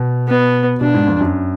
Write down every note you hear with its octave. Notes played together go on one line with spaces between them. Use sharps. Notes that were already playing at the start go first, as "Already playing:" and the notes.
Already playing: B2
B3
B2 D4
G#2
F2
F#2